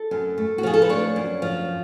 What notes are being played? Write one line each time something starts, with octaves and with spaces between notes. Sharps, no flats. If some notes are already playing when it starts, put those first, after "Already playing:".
Already playing: A4
F#2
A3
F#4
F3 G#4
A4
B4
D4 C#5
F#2
F3